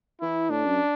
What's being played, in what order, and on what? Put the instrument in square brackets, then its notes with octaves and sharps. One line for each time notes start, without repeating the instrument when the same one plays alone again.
[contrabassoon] E3 [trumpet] E4
[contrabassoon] A2 [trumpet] D4
[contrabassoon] F#2